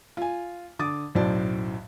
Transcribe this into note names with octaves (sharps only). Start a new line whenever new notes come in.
F4 G#5
D3 D6 D#6 A6
B1 F#2 A2 C5 D5 A5